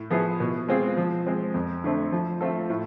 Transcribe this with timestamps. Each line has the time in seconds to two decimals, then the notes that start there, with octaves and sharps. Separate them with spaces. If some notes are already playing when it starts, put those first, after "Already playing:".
Already playing: A2
0.10 F3 B3 E4 G#4
0.40 B2
0.68 G#3 C4 F4 G#4
0.97 F3
1.27 G#3 C4
1.54 F2
1.84 D3 A3 C4
2.12 F3
2.41 A3 C4 F4 A4
2.70 A2